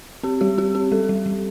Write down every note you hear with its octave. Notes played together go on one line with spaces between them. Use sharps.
C4 G4
G3 G4
C4 G4
C4 G4
G3 A4
G3
G3